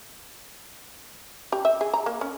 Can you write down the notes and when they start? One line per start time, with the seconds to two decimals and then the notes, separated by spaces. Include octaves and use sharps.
1.52 G4
1.65 E5
1.81 G#4
1.93 A#5
2.06 A#3
2.21 C#4